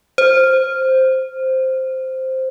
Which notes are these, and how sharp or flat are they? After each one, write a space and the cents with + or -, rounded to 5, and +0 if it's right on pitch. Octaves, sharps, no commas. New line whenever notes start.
C5 +0